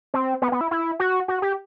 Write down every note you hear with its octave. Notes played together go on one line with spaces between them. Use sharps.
C4
B3
B3
E4
E4
F#4
F#4
G4